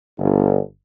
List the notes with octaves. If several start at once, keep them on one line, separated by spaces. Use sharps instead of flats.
G1